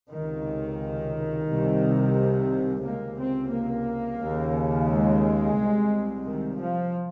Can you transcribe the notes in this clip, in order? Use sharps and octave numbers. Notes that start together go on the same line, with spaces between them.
C#2 C3 D#3
C2 C3
C#2 C3 A#3
C4
A#3
D#2 C#3
G#3
C2 C3
D#3
F3